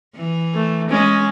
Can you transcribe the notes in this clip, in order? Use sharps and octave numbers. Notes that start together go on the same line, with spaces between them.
E3
A3
G#3 C#4